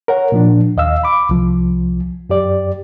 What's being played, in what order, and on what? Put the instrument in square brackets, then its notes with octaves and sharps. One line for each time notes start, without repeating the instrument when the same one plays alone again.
[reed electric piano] A#4 C#5 F#5
A#2 F3 D4
D#2 D#5 F5 E6
B5 D6
C2 F3
F#2 G4 D5